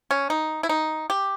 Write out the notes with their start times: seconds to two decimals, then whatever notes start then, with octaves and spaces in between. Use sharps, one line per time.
0.11 C#4
0.30 D#4
0.63 E4
0.69 D#4
1.10 G4